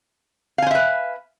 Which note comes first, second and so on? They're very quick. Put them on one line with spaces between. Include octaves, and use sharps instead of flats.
F5 G#5 C5 E5 B4